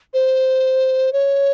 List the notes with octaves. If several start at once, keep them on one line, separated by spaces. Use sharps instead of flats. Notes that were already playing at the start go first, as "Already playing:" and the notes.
C5
C#5